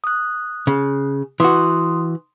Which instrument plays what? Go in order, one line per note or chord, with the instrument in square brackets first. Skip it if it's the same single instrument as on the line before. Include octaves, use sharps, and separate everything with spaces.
[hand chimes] D#6 F#6
[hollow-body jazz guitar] C#3
[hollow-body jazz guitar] E3 F#4 [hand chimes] C6 D#6